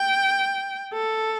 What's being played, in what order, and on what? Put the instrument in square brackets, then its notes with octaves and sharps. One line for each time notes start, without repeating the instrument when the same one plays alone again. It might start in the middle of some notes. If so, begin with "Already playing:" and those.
Already playing: [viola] G5
A4